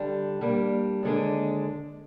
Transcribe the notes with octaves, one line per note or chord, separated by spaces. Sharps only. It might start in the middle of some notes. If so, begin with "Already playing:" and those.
Already playing: D3 G3 D4
G3 A#3 D4
D#2 D3 G#3 D4